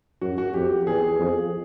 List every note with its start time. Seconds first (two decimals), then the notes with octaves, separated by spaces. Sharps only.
0.21 F#2 F#4
0.38 F#4
0.54 F2 G4
0.87 E2 G#4
1.19 F2